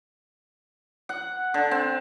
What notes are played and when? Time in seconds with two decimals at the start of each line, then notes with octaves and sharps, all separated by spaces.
1.09 F#5
1.54 D3
1.71 C4